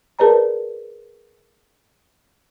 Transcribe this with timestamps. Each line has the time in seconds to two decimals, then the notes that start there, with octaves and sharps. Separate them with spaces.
0.19 G#4 A#4 B4 D5 A5 A#5